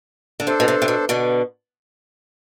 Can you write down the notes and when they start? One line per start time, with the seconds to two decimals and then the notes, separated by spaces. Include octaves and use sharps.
0.40 D3
0.46 C3 D4 A4 C5
0.60 B2
0.68 C3
0.82 C3
0.88 B2
1.09 B2 D3